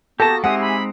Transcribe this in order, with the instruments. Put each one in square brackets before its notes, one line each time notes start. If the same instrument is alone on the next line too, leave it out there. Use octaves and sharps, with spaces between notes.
[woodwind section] A#3 B3 F#4 [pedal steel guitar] G4 A5 [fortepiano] A4 [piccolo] A#6
[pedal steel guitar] G#3 C4 D#4 [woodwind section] G4 E5 G#5 [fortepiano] F#5 [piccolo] D#6
[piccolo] B5